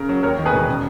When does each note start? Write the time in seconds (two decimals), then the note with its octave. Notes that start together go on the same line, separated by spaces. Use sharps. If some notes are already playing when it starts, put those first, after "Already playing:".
Already playing: C#3 A#4
0.09 F#3
0.23 D#2 A#4 C#5
0.39 D#3
0.46 G#4 B4
0.53 E1
0.68 C#3